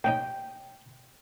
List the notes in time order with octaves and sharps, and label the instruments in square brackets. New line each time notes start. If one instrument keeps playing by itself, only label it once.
[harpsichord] A#3 C#4 D#4 [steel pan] G5